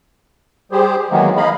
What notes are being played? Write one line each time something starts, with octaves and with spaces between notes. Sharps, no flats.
G3 G4 G#4 C5
D#3 E3 F#3 G#3 A#3 B3
D#4 G#4 D#5 F5 B5